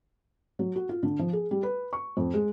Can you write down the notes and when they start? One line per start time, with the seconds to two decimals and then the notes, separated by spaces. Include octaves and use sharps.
0.59 F#3
0.76 F#4
0.89 F4
1.03 D3
1.19 F3
1.33 G#4
1.51 G3
1.63 B4
1.93 C#6
2.17 F2
2.34 G#3